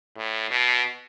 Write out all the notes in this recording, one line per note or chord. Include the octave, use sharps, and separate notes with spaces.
A2
B2